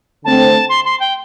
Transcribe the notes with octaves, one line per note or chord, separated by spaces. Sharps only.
D3 A3 C4 A5
C6
C6
G5